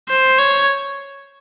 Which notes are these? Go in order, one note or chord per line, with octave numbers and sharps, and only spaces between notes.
C5
C#5